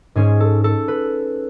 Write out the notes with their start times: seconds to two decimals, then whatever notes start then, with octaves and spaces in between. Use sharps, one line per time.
0.15 G#2 G#3 C#4 G#4
0.40 A4
0.64 A4
0.88 B4